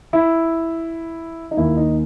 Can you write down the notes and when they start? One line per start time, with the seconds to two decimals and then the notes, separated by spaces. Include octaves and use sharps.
0.13 E4
1.51 D#4
1.57 D#2 D#3 A#3 E4
1.77 D#4